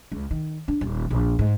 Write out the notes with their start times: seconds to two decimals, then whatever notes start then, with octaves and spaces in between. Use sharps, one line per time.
0.12 C#2
0.31 D#3
0.68 D4
0.81 D#1
1.10 A#1
1.39 G#2